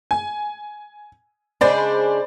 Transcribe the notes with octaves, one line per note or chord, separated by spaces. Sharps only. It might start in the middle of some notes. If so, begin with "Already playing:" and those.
G#5
C#3 G#3 D4 C5 D5 B5